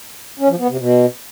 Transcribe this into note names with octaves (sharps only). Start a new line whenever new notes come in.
C#4
F3
B3
C3
B2